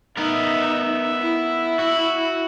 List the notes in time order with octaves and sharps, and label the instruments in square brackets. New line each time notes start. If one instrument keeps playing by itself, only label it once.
[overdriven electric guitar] B3 A#4 [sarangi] D#4 [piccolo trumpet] E5
[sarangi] E4
[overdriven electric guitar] F#4